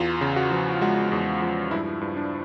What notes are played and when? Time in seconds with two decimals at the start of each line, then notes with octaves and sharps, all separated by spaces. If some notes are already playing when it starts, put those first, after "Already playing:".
Already playing: E2 F4
0.21 C#3
0.36 F#4
0.52 F3
0.81 G#3 F#4
1.12 E2
1.42 F3
1.71 G2 E4
2.01 G2
2.17 D4